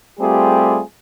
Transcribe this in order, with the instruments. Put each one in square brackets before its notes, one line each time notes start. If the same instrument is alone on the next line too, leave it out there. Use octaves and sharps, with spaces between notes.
[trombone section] G3 A3 C4 F4 G4 G#4